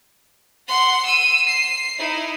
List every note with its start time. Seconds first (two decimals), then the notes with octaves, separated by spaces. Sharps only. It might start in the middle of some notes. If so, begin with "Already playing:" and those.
0.68 F#5 C6
1.05 E6 D#7
1.47 C7
1.98 D#4 E4